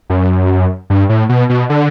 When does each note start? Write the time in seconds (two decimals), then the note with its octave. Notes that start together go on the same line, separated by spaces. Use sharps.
0.10 F#2
0.90 G2
1.09 A2
1.29 B2
1.49 B2
1.70 D3